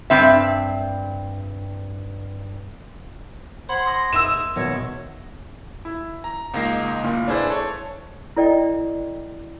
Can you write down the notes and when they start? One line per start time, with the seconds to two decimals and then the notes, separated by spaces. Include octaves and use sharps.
0.10 G2 C4 E5
3.69 C5 F#5 B5 C6 G#6
3.85 C6 D#6 A#6
4.13 D#4 A#4 E5 E6 E7
4.56 D#1 B2 C#5 D#5
5.85 E4
6.24 A#5
6.54 C#2 A#3 D#4 A#6 C7
7.04 F#1 A#2 F4
7.28 D4 E4 G#4 B4 C5 D5
7.50 A4 C#5
8.37 E4 A4 D5 D#5 G5